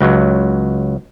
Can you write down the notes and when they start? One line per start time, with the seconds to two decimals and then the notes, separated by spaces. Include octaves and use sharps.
0.01 C#2 F#3